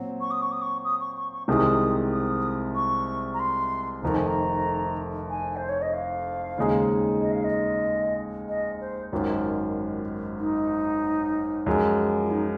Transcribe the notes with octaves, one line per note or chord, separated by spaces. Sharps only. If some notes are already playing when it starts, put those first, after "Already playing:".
Already playing: A#2 F#3 C4
C#6
D#6
C#6
D#6
C#6
D#6
C#6
C#6
C#6
C2 C3 D#3 G#3 C4 D#6
D#6
C#6
A#5
C6
F1 F2 D#3 A#5
G#5
A#5
G#5
C5
C#5
D#5
F5
D#2 C#3 G#3 D#4 G#4
D#5
F5
D#5
D#5
C5
G#1 F#2 D#3 F4 F#4
D#4
F#2 F3 G#3
F4
D#4